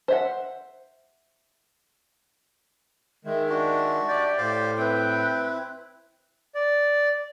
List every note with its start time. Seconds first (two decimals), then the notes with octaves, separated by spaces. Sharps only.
0.08 C5 E5 F#5
3.25 D#3 G#3 E5
3.49 D4 F#4 E5
4.08 G4 D5
4.38 A2 C5 D5 F5
4.78 C4 E4 B4 G5
6.55 D5